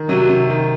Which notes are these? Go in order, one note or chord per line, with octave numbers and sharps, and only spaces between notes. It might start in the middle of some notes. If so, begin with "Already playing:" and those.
Already playing: D#3
C3 F#3
C3
D#3